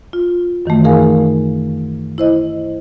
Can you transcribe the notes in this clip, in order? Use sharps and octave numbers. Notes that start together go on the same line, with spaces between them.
F4
F#2 D#3 E3 A3
D#4 G#4 A#4 F5 G#5
E4 C5 D#5